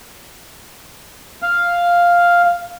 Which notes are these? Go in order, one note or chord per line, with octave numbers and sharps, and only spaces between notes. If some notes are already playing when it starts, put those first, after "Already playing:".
F5